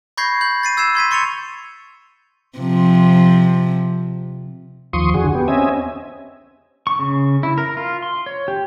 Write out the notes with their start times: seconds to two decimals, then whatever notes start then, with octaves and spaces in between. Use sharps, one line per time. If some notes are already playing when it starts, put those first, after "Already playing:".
0.17 B5 C#6 G6 G#6 A#6 C7
0.41 G6 F#7
0.63 A6 C7 D#7
0.77 E6 G#6 C7 E7
0.95 C6 G#6 B6 D#7
1.11 C6 C#6 A6 C#7 D#7 F7
2.58 C3 F3
4.93 D#2 F3 C6 C#6 D#6
5.14 E2 D3 F#4 G#4
5.35 B3 G4
5.48 C4 C#4 D#5 E5 G#5
6.87 C#6
6.99 C#3
7.43 E4
7.58 A#4
7.77 F4
8.02 C6
8.26 C#5
8.48 G4